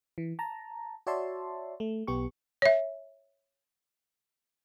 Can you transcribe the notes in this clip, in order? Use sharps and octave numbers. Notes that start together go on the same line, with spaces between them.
E3
A5 A#5
F#4 C#5 D5 E5 A5 C6
A3
B1 B3 G4 C#6
C#5 E5